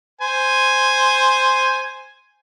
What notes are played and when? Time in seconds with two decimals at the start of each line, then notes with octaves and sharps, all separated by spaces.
0.21 C5 G#5